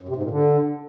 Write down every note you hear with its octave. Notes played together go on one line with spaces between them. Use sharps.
F#2
C3
G#2
A#2
D3